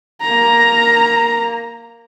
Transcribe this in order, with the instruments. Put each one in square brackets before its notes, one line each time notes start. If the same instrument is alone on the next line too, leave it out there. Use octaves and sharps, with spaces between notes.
[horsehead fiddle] A#3 A#5